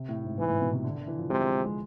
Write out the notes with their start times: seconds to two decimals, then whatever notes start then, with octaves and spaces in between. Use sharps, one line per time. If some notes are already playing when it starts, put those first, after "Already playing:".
Already playing: C3
0.09 A2
0.24 G#2
0.39 G#2 E3
0.49 A2
0.62 B2
0.73 C3
0.84 D3
0.95 D3
1.07 E3
1.18 F3
1.30 C3 G#3
1.42 G#3
1.52 G#3
1.64 G#3